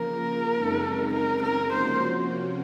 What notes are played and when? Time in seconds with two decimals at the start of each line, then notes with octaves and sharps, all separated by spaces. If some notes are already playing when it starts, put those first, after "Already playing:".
Already playing: C#3 F3 A#3 A#4
0.53 F#2 C#3 G#3 C4 D#4
1.14 A#4
1.43 A#4
1.73 C3 F3 A#3 C#4 F#4 C5